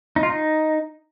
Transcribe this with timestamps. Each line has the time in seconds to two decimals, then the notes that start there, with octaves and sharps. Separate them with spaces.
0.16 D#4
0.23 F4
0.30 D#4